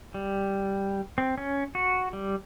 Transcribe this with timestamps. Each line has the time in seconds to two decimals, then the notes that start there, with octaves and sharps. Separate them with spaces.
0.14 G3
1.18 C4
1.38 C#4
1.75 F#4
2.13 G3